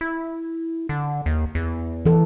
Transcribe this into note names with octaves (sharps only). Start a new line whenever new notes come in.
E4
D3
D#2
E2
E3 A4